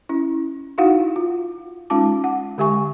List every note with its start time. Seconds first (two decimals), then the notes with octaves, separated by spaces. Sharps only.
0.09 C#4 E4
0.78 D#4 E4 F#4 F5 F#5
1.16 F4
1.90 G#3 C#4 D#4 F4 A5 D6
2.24 F#5
2.58 D3 G#3 G4 E5 G#5 C#6